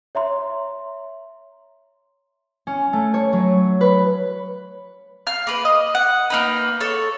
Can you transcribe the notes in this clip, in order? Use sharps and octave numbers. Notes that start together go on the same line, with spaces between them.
C#5 E5 A#5 C6
C#4
A3
C#5
F#3
B4
F5 F6
A#3 B4
D#5
F#5
A#3 D#4 B4
A4 C#5